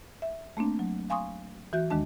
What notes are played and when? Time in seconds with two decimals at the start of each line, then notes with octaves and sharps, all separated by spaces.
0.22 E5
0.57 A3 A#3 C4 D4
0.79 F#3
1.10 F5 G#5 C6 C#6 D#6
1.73 E3 F#4 E5 G6
1.90 D#2 D#3 G#3 D4 A5